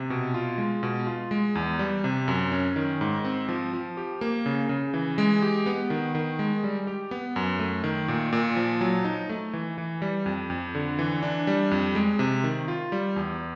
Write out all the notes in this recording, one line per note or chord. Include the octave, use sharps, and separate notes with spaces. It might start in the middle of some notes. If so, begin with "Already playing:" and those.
Already playing: C3
B2
F4
G#3
B2
F4
G#3
E2
G3
C3
F#2
C#4
D#3
G#2
C4
F3
F3
G4
A#3
C#3
C#3
E3
G#3
G4
B3
D#3
D#3
G#3
G3
G4
B3
F#2
A3
D#3
A#2
A#2
F3
F#3
D#4
A3
E3
E3
G3
F2
F2
D3
E3
D4
G3
F2
G#3
C3
D#3
F4
G3
E2